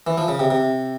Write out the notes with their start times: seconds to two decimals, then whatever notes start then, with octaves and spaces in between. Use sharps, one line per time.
0.07 E3
0.18 F3
0.28 C#3
0.39 C3
0.51 C3